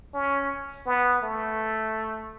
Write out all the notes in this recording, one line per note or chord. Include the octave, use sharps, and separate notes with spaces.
C#4
B3
A3